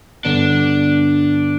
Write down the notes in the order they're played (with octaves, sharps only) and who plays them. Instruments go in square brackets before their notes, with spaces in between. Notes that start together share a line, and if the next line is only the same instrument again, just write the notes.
[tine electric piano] G2 D3 B3 [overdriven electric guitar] D4